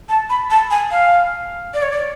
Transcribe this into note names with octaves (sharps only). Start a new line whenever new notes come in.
A5
B5
A5
G#5
F5
D5
C#5
D5